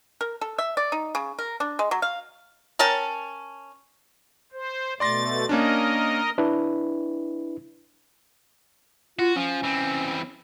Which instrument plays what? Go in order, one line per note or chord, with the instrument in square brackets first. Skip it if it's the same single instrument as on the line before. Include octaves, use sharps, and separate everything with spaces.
[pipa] A#4
A4
E5
D5
D#4
C#3
A#4
D4
G#3
F#3
F5
C#4 A#4 G5 A5
[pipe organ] C5
[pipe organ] B2 A3 A6 [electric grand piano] D5 C6 A#6
[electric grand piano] A#3 C#4 D4 [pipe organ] A#4 D#5
[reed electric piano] D4 E4 B4
[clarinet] F4 [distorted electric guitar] F#4
[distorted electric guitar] F3 [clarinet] C#4
[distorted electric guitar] E3 C4